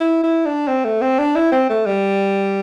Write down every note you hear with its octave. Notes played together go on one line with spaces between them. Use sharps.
E4
E4
D4
C4
A3
C4
D4
E4
C4
A3
G3